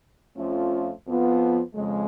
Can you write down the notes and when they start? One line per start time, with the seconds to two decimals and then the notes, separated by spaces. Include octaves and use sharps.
0.37 F2 F3 A3 C#4 F4
1.06 F2 F3 B3 F4
1.74 F2 C#3 G#3